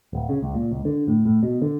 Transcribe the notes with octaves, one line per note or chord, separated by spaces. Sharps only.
D1
C#3
C#2
A#2
C#2
D3
A2
A2
B2
D3